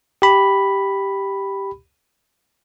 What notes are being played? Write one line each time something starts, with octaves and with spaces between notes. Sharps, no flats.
G4 B5